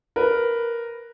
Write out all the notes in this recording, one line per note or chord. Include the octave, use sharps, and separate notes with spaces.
A#4 B4